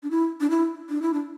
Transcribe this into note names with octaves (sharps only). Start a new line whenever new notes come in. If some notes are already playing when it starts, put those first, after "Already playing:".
D4
E4
D4
E4
D4
E4
D4